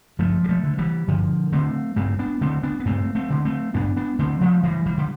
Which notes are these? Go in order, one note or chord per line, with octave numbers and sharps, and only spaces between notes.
G2 F3 A3
G3
F3 A3
D3
E3 G3
G2 D3 F3
D3 A3 C4
G2 A3 C4
B3 D4
D3 A3 C4
B3 D4
B3
G2 A3 C4
A3 C4
D3
A3 C4
G2 B3 D4
B3 D4
D3 A3 C4
F3 A3
G2 E3 G3
E3 G3
D3